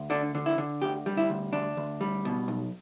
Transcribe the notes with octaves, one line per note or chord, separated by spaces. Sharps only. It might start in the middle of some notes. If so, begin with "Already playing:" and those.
Already playing: D2
D3 D4
D3
E4
D3
D2 G4
G3
E4
D2
D2 D4
D2
G3
B2
B1